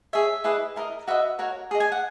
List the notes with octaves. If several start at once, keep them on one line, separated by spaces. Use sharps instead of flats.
G#4 C#5 E5
E4 G#4 B4 D#5
E4 A#4 D#5
F#4 B4 D#5 E5
F#4 A#4 C#5
G#4 D#5
G#5
F#5